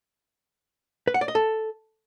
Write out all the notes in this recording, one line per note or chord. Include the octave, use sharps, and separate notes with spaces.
B4
F#5
D5
D#5
A4